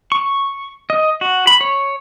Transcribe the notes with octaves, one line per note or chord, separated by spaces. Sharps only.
C#6
D#5
F#4
B5
C#5